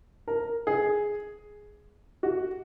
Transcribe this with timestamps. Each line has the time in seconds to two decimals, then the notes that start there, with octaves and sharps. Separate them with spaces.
0.28 A#4
0.67 G#4
2.23 F#4